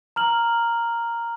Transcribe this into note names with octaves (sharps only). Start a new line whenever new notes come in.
A#5 F6 F#7